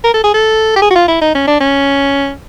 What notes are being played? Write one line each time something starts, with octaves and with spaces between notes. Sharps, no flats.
A#4
A4
G#4
A4
G4
G#4
F#4
F4
E4
D#4
C#4
D4
C#4